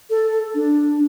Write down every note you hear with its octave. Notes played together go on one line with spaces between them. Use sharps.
A4
D4